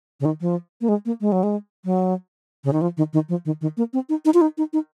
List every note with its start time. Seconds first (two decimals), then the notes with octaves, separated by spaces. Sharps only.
0.20 C#3
0.25 D#3
0.41 F3
0.81 A#3
0.89 G#3
1.06 A#3
1.21 G#3
1.32 F#3
1.43 G#3
1.85 F#3
2.64 C#3
2.73 D#3
2.81 F3
2.97 D#3
3.13 D#3
3.29 F3
3.45 D#3
3.61 D#3
3.77 A#3
3.93 C4
4.09 D#4
4.25 D#4
4.34 F4
4.41 D#4
4.58 D#4
4.73 D#4